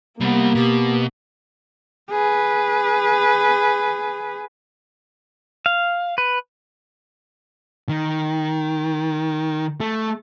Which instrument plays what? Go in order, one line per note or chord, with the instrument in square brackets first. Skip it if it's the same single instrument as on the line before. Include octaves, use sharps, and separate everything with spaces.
[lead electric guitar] C2 G3 [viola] A#3 [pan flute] B3
[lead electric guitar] B2 [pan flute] G4
[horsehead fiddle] G#4 B4
[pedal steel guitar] F5
B4
[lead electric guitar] D#3
A3